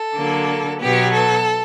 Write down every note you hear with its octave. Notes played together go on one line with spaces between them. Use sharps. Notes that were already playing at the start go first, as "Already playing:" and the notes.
Already playing: A4
D3 F#3 A#3
B2 F#3 B3 G4
A4